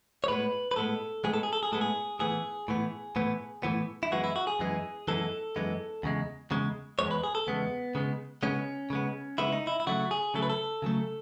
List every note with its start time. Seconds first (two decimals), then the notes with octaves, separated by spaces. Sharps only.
0.24 C#5
0.28 A2 G#3 B3 B4
0.71 B4
0.76 A2 G#3 B3 A4
1.24 A2 G#3 B3 G#4
1.33 A4
1.43 G#4
1.53 A4
1.63 G#4
1.72 A2 G#3 B3 A4
1.81 G#4
2.19 A2 E3 B3 G#4
2.68 A2 E3 B3
3.16 A2 E3 B3
3.63 A2 E3 B3
4.03 E4
4.12 F#2 E3 G#3 B3 F#4
4.24 E4
4.36 F#4
4.47 G#4
4.59 F#2 E3 G#3 B3
5.08 F#2 E3 G#3 B3 A4
5.56 F#2 E3 G#3 B3
6.03 E2 C#3 G#3
6.51 E2 C#3 G#3
6.99 E2 C#3 G#3 C#5
7.11 B4
7.24 G#4
7.35 A4
7.47 E2 C#3 G#3 B3
7.95 C#3 G#3 B3
8.43 C#3 G#3 B3 C#4
8.90 C#3 G#3 B3
9.38 C#3 G#3 B3 E4
9.52 D#4
9.67 E4
9.80 E4
9.87 C#3 F#3 A3 F#4
10.11 G#4
10.34 C#3 F#3 A3 A4
10.42 B4
10.50 A4
10.82 C#3 F#3 A3